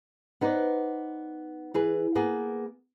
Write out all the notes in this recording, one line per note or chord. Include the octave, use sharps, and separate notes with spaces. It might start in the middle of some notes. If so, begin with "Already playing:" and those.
B3 D#4 B4 C5 D5
E3 G#4 B4
A#3 B3 G#4